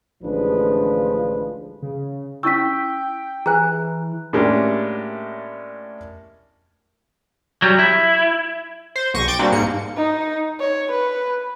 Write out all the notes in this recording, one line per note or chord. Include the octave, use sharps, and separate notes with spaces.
A1 D2 F3 G#3 D4 B4
C#3
C#4 E4 G5 C#6 E6 B6
E3 G#4 B4 G#5 A#5 F#6
A2 G#3 A#3 C#4 D4 G4
F#3 G3
E4
C5
B1 C#6 A#6 D#7
G5 D6 G6 A6
G3 A#3 C4 D4 F#4
G#2 A#3 C#7
D#4
C#5
B4